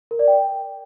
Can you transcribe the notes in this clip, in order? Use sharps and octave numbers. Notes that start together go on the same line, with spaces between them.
A#4
D5
G5